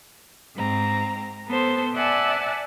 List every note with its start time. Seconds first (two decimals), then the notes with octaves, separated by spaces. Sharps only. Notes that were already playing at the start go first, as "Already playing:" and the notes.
0.56 G#2 C4 A#5
1.48 B3 A4 C5
1.96 D5 E5 F#5 G#5 A5